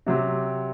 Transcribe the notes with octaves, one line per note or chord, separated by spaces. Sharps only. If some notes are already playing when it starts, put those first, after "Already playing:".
C3 F#3 C4 G4